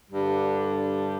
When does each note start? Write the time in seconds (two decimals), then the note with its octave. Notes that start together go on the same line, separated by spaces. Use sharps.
0.11 G2 D3 G3 D4